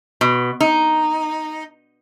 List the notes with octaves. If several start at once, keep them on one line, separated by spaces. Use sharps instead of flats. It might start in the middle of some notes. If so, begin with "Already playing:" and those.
B2
D#4